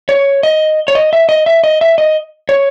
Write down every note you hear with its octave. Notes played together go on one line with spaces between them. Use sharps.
C#5
D#5
C#5
D#5
E5
D#5
E5
D#5
E5
D#5
C#5